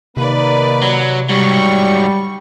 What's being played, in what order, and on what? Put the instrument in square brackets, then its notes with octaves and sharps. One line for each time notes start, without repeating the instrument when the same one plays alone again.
[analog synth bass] C3 [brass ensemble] D#3 A#3 [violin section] B4 D5
[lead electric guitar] F#3
[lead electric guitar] G#2 F#3 [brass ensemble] G3 [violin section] C#6